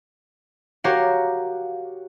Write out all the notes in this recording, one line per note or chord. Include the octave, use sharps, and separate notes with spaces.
F#4 G4 A#4 C#5 F5